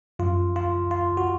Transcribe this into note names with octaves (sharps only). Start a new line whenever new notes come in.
F#2 F3 F4
F4
F4
F#4